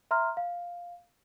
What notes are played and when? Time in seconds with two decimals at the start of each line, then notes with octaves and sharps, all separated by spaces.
0.11 E5 A#5 C6 F6
0.37 F5